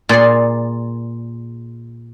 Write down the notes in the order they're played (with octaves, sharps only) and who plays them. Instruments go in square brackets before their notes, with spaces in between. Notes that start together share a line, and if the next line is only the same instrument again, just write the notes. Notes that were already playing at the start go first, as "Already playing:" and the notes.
[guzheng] A#2 G#4 D5 C6